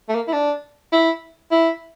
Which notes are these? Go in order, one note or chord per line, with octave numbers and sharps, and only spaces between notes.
A3
A#3
E4
D4
E4
E4